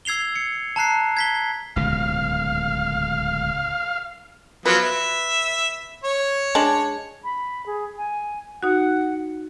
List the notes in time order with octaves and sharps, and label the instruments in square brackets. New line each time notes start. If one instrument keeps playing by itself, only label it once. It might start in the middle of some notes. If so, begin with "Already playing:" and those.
[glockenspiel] E6 G#6 C7 F7 G7
C#7
A5 A#5 F#6 C7
G#6 B6 G7
[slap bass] D1 C#2 B2 [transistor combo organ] F5
[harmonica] F3 F#3 B3 [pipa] B4
[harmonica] E5
C#5
[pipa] G#3 D4
[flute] B5
G#4
G#5
[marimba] D#4 F#4 [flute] F#5